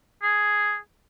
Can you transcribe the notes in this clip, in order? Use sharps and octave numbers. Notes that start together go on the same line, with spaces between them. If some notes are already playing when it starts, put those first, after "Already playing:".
G#4